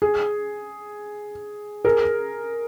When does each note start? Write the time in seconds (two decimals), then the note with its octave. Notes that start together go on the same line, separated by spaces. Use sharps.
0.02 G#4
1.85 G#4 A#4